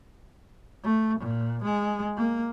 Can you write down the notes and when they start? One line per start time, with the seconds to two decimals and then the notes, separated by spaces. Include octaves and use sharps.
0.84 A3
1.19 A#2
1.64 G#3
2.17 A#3